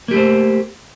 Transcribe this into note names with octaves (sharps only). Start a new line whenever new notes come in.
A3 A#3 G4 C5